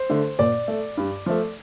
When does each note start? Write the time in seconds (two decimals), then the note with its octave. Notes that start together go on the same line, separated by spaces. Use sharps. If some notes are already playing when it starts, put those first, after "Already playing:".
Already playing: C5
0.10 D3 A3
0.39 A#2 D5
0.68 A3
0.97 G2
1.26 F3 A3